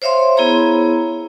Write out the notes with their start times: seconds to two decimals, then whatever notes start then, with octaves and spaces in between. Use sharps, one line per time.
0.02 C5 C#5 E5 F5 C6
0.37 B3 E4 G#4 C#5 A#5